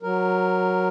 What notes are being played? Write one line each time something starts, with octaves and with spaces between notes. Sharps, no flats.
F#3 A#4